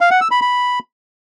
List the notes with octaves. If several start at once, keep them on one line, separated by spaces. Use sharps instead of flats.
F5
F#5
E6
B5
B5